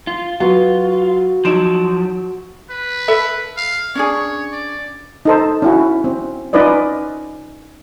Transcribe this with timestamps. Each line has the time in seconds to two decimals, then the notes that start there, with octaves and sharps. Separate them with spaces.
0.07 F4
0.40 F#3 F4 F#4 B4
1.45 F3 F#3 D#4 D7 E7
2.70 B4
3.08 A4 E5 B5
3.57 F5
3.95 C#4 D4 G#4 C#5
4.52 D5
5.25 D#4 A4 C5
5.62 C#4 E4 F#4
6.04 C4
6.53 C#4 D#4 F4 B4 D5 D#5